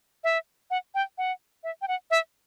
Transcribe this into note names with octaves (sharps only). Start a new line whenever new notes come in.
E5
F#5
G5
F#5
E5
G5
F#5
E5